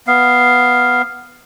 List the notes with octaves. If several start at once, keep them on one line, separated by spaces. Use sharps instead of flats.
B3 F5